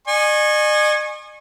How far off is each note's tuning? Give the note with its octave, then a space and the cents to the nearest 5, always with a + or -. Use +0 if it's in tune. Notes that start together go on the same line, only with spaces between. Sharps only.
D#5 -45 G#5 +0 C#6 -30